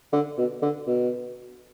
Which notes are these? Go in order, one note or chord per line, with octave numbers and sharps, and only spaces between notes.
D3
B2
D3
B2